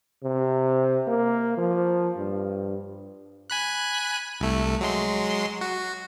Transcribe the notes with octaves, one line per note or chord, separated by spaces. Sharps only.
C3
A#3
F3
G2
G#5 B5 F#6
C2 A3
F#3 G#3 C6
F#4